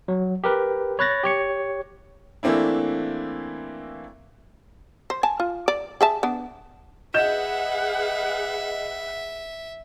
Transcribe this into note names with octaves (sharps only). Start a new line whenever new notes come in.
F#3
G4 A#4 B4
C#5 B5 F#6 A6 A#6
G4 C#5 C#7
E3 A3 A#3 C4 D4 E4
C5
G#5 A5
F4
D5
G#4 E5 A5
B3 D4
G#4 B4 D#5 E5 F#5 G6 E7